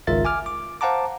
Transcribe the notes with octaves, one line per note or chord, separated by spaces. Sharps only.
G#1 C#2 F4 A#4 E5 A6
G#5 D6 F6
D6
C5 F5 F#5 A5 A#5 D6